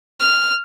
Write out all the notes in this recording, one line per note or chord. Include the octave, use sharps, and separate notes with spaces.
F6